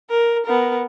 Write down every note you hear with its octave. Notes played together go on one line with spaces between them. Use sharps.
A#4
B3 A#4